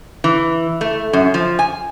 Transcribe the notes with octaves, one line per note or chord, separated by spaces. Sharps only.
E3
A3
F#2
F3
G#5